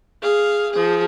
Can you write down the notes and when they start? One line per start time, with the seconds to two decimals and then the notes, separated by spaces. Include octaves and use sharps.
0.22 G#4 F5
0.71 F3 G#4